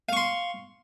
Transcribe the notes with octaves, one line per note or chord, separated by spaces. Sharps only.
F5 C6 C#6